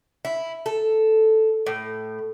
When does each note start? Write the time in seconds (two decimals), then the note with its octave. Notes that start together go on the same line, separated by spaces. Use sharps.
0.25 E4
0.66 A4
1.66 A2